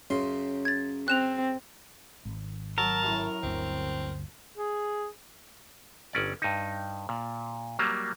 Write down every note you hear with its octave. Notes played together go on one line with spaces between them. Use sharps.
F#2 C#3 C#4 C6
G#6 A6
C4 F#6 E7 F7
G#1
F#3 A#4 A5
F#2 A2
G1 D2 C4
G#4
G1 C#4 D5
G2 D#4
A#2
F#3 G3 A#3